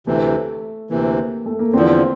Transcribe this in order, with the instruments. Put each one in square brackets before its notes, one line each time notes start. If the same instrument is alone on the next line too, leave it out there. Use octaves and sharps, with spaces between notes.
[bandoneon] D2 C3 E3 [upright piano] A3
[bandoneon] D2 C3 E3 [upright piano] A#3
[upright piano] A3
A#3
[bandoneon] E2 D3 F3 [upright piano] C4